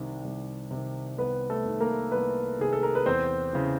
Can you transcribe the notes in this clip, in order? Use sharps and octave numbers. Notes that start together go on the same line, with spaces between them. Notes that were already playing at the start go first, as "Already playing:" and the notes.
Already playing: C2 C3 D#3
C2
C3 D#3
C2 B3 B4
A3 A4
C3 D#3
A#3 A#4
C2 B3 B4
C3 D#3 G#4
A4
A#4
B4
E2 C4 C5
C#3 E3